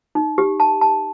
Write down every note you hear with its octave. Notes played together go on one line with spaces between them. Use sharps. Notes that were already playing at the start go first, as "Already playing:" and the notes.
D#4
G4
A5
A5